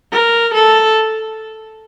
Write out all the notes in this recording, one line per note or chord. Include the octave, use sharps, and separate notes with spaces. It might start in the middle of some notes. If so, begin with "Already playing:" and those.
A#4
A4